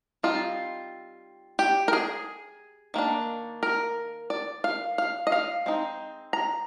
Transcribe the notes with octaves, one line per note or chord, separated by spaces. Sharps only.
G3 C4 D#4 F4
G4
A#4
G#4
D#3 A#3 D4
A#4
D5
F5
F5
D#5
F5
G#3 C4 D#4
A#5